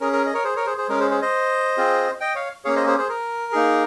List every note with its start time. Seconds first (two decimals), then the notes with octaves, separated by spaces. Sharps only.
0.01 C#4 G#4 A#4
0.13 A#4
0.26 D#5
0.34 A#4 C#5
0.44 G#4 C5
0.56 A#4 C#5
0.66 G#4 C5
0.78 G#4 C5
0.89 G#3 C#4 G#4 A#4
1.00 G#4 C5
1.11 G#4 C5
1.22 C5 D#5
1.78 C4 F4 G#4
2.20 D#5 G5
2.35 C#5 F5
2.65 A#3 C#4 G#4 C#5 F5
2.76 C5 D#5
2.86 G#4 C5
2.98 G#4 C5
3.09 A#4
3.52 A#3 D#4 G#4